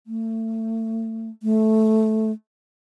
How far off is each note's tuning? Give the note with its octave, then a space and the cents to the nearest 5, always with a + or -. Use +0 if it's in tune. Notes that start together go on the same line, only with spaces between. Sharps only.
A3 +30
A3 -10